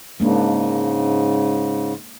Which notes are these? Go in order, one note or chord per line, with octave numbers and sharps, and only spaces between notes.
G#2 C#3 G#3 A#3 D4